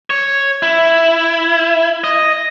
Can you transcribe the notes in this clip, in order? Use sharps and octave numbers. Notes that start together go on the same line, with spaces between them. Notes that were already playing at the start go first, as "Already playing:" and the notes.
C#5
E4
D#5